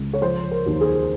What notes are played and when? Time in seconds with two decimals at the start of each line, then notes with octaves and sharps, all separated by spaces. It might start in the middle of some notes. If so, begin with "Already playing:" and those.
Already playing: C#2
0.13 C#5
0.22 F3 C5
0.51 A#4
0.66 D#2
0.81 G#4